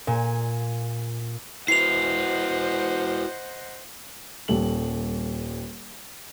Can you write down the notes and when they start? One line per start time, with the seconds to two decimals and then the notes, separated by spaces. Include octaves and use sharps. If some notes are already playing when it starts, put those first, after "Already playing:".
0.07 A#2 G#5
1.68 E4 F#4 B4 C5 D#5 F#5 C7 F7
4.48 D#1 G3 A4 F#7